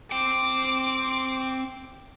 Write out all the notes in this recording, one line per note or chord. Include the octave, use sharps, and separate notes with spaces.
C4 G5 D6